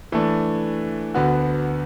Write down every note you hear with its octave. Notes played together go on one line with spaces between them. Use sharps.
E3 A3 D4
D2 D3 B3 F#4